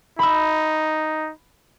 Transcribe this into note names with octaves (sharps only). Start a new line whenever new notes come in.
D#4 B5 E6